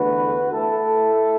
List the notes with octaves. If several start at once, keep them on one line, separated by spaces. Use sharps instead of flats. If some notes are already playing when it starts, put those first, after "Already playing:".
Already playing: E2 D3 A3 F#4 B4
A3 E4 A4